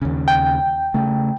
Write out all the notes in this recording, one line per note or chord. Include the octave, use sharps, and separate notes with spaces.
D#2 C#3
G5
C#3 A3